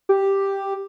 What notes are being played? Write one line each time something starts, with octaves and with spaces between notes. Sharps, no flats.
G4